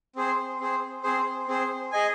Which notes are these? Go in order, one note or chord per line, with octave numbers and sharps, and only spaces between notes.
C4 G#4 C5
C4 G#4 C5
C4 G#4 C5
C4 G#4 C5
G#4 D#5 G#5